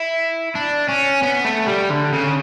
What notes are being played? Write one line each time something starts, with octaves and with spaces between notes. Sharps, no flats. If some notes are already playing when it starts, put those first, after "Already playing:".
Already playing: E4
D4
C#4
B3
A3
G3
D3
C#3